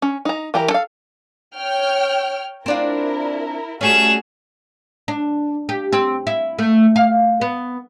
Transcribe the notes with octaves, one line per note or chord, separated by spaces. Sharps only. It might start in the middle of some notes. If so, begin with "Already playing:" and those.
C#4
D#4 A#5
E3 G4 A#4 A#5
A4 F5
C#5 G5 F6
C4 D4 E4 F4 A#4
G3 A3 C#4 F#4 G#4 A4 E7
D4
G4
C4
E4
A3
F5
B3